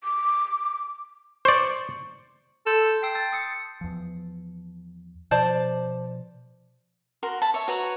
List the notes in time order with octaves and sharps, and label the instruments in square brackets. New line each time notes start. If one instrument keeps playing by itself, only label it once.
[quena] D6
[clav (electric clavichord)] C5 D5 [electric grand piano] C#6
[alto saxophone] A4 [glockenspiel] C6 G6
[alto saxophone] G5 [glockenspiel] E6 C7
[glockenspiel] A5 E6 A6
D#6 E6 C#7
[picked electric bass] E2 F3
[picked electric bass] B2 F3 [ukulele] C5 D5 A5
[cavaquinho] F#4 A#4 C6
A5 B5
C#5 E5
F#4 B4 C#5 A#5